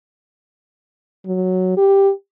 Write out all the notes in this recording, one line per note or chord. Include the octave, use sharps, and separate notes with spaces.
F#3
G4